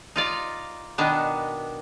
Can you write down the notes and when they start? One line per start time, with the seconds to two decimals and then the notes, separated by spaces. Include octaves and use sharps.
0.16 D#4 F4 D5
0.98 B2 D#3 B3 D4